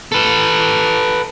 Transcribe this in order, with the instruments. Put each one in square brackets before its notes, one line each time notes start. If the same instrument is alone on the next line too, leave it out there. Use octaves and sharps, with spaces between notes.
[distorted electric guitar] A4 B4